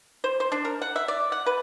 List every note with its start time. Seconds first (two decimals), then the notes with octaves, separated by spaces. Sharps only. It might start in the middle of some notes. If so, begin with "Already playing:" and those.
0.24 C5
0.40 C5
0.52 D4
0.65 A#4
0.81 F#5
0.96 E5
1.08 D5
1.32 F#5
1.46 B4